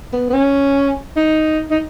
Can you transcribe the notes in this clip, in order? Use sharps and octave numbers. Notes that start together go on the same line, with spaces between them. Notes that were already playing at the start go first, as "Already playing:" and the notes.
B3
B3
C#4
D#4
D#4